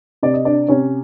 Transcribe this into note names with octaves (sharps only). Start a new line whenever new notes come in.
C3 D5
D#5
D4 D5
C3 C#4 C#5